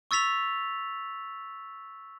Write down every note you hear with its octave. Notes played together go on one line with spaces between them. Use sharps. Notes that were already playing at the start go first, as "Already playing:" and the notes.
C#6 E6 A6 B6 F7